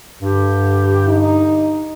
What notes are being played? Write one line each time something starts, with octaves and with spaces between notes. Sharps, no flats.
G2 D3 G4
D#4